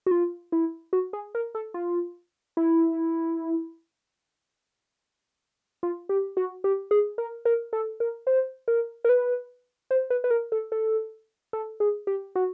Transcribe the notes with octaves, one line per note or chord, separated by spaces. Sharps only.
F#4
F4
E4
F#4
G#4
A#4
A4
F4
E4
F4
G4
F#4
G4
G#4
A#4
A#4
A4
A#4
C5
A#4
A#4
B4
C5
B4
B4
A#4
A4
A4
A4
G#4
G4
F#4